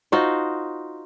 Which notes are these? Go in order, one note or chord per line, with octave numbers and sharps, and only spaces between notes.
D#4 F4 F#4 C5